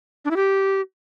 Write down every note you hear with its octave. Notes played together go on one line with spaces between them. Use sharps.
D4
E4
G4